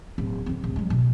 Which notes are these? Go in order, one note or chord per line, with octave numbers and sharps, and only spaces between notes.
D1
D3 C4
D1 C2
F#3 G#3
B2